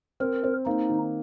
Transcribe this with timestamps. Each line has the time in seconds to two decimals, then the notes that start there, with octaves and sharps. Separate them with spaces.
0.20 C4 A#4
0.44 C4
0.66 A#3 D#4
0.90 D#3